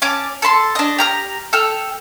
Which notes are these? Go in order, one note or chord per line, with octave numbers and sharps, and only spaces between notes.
C#4 A5 D6
A4 A5 B5 C6
D4 D#5
G4 A#5 F6
A4 G5 F6